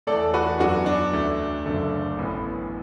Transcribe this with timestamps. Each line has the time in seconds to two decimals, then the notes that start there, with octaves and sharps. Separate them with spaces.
0.07 E2 E3 A3 A4 D5
0.34 F#4 B4
0.59 F#2 F#3 B3 D4 F#4
0.86 D4
1.13 D2 D3 A3
1.65 F#1 F#2 D3 A3
2.17 A1 A2 E3 B3